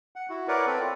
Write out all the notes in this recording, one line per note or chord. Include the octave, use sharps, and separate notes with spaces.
F#5
E4 F#4
A#4 B4 C#5 D5 F#5
C4 A4 B4
F4